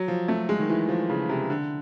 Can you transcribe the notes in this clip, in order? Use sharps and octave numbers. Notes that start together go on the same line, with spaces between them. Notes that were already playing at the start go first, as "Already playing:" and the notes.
Already playing: F#3
F3
A3
G#3
D#3
E3
F3
C#3
C3
D3